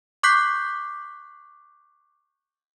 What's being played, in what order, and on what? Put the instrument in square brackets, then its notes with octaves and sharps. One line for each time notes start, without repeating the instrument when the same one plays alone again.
[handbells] C#6 D6 F#6 G6 B6 C7